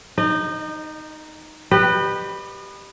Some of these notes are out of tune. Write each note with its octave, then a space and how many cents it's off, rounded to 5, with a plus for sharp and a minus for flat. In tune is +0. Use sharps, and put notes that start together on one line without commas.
D#4 +0 D#5 -35
G4 +0 B4 +0 D#5 -40